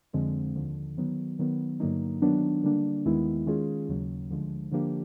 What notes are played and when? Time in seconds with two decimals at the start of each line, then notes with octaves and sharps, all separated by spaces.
0.13 F2 D3 F3 G#3 C4
0.56 D#2 D3 F3
0.97 D#3 F#3 B3
1.39 D#3 F#3 B3
1.80 G2 D3 F#3 A#3 D#4
2.22 D#3 F#3 B3 D4
2.63 D3 G3 A#3 D4
3.05 D#2 D#3 G#3 B3 E4
3.46 D#3 G#3 C#4 F4 G#4
3.89 D#2 C#3 F#3
4.30 D2 D3 F3 G#3
4.71 D3 F3 A#3 D4 G4